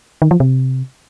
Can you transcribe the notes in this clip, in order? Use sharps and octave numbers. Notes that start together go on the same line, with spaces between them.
D#3
F3
C3